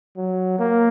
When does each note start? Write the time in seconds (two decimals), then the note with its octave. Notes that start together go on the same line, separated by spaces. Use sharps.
0.17 F#3
0.60 A#3